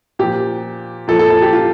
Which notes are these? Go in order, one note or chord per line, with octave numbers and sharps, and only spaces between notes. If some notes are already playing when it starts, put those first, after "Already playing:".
A#2 F3 G4
A#2 F3 A4
A4
A4
G4
F4